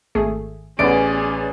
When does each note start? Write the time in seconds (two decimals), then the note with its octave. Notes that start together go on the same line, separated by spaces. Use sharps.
0.15 G#1 A3 G#4
0.79 A1 A3 B3 C#4 G#4 D5 D7